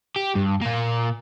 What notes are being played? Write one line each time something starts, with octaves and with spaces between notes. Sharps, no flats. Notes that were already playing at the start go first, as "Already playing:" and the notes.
G4
G2
A#2 A#3